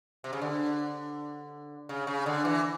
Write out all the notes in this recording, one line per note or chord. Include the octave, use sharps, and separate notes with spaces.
C3
C#3
D3
C#3
C#3
D3
E3